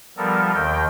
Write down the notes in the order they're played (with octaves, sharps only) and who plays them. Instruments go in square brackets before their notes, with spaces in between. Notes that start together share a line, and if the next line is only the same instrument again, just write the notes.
[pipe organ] F3 G3 B3 A4 A#4
D#2 D#3 G5